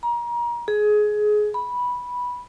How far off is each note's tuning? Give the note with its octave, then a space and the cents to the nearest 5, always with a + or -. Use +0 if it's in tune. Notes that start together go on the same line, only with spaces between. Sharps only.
A#5 +35
G#4 +20
B5 -10